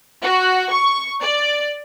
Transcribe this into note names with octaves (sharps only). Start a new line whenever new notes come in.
F#4
C#6
D5